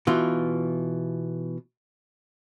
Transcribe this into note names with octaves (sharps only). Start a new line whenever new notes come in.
B2 E3 F4